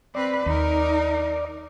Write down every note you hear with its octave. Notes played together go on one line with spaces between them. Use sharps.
C4 B4 D5
D#2 D#4 A#4